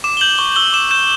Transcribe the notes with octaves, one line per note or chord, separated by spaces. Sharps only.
D6 E7
G7
G6 F#7
C#6 G7
E6 G6 G7
D6 E7
G6 E7